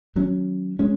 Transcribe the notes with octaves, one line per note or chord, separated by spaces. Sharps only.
D#3 F#3 C#4
G#3 C#4